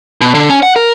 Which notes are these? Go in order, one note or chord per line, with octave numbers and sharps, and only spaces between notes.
B2
D3
C#4
F#5
A#4